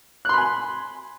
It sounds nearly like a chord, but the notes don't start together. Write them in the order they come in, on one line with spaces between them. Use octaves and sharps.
F#6 C6 B5 G#5